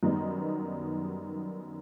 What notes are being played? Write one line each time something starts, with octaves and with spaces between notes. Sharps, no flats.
F#2 D#3 G3 B3 D#4